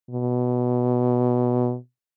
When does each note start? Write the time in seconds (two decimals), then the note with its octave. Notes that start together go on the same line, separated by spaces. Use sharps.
0.10 B2